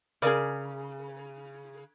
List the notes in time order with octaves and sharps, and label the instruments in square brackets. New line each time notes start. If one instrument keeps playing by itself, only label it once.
[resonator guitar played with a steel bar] C#3 [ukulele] G#4 A#4 D5